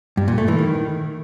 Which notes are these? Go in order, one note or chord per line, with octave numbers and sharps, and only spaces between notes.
G2
A#2
A3
E3
D#3